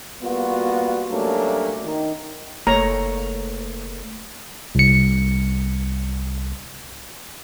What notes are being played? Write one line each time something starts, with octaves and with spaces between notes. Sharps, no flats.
G3 A#3 B3 F4 F#4
F#3 G3 A3 A#3 C#4 D4
D#3
F#1 A3 A#3 C#5 A#5
C2 C#7